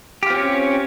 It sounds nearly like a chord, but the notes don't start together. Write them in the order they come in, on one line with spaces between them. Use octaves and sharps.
G4 F4 C4 C#4